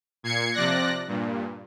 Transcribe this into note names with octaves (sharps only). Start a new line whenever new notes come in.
A#2 G#6 C7 C#7
C3 F3 D5 F#6 A#6
G2 A#2